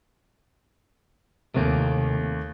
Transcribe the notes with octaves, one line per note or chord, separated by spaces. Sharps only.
D#2 C3 A3 A#3